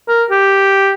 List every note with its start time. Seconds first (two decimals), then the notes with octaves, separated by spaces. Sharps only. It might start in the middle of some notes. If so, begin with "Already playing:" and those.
0.08 A#4
0.31 G4